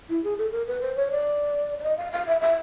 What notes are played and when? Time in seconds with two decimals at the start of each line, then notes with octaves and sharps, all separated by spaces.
0.09 E4
0.24 G#4
0.38 A4
0.52 A#4
0.67 B4
0.81 C5
0.96 C#5
1.11 D5
1.79 D5
1.83 D#5
1.97 F5
2.12 F5
2.27 E5
2.41 E5